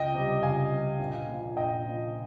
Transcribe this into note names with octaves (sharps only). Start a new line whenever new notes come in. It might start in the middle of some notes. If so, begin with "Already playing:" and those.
Already playing: C#2 D#5 G5
C3 G3
C#2 F5 G#5
C3 G3
A#1
A#2 F3
A#1 D#5 G5
A#2 F3